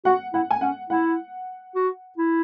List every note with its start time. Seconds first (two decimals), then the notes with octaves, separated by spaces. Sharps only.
0.05 F#4 F#5
0.33 E4 F#5
0.50 G#5
0.61 C#4 F#5
0.90 E4 F#5
1.75 F#4
2.18 E4